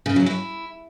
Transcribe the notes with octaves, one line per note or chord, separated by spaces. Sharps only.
C#3
F#3
E4